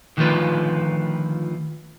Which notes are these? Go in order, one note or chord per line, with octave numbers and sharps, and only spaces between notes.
D3 D#3 F3 A3 F4 B4